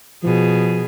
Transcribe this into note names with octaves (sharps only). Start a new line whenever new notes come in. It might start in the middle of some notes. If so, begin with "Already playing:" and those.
B2 F3 G#4